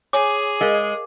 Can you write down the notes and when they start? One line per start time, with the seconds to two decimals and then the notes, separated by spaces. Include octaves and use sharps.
0.13 G#4 C#5 G#5 D6
0.61 G#3 A#4 D#5 F5